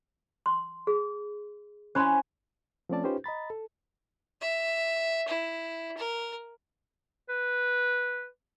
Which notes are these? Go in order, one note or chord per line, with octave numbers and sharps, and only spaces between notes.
C6
G#4
C#4 E4 C5 G#5 B5 C6
F3 A3 C4 C#4 D5 A5
C#4 D#4 F4 G4 B4 C5
D#5 A#5 B5 A6
A4
E5
E4
A#4
B4